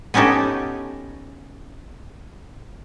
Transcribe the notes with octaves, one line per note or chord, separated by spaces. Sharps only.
B3 C#4 D#4 G4 A4